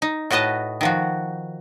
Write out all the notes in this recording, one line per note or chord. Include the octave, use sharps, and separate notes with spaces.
D#4
A2 F#4 B4 D#5 A5
D#3 F3 F#4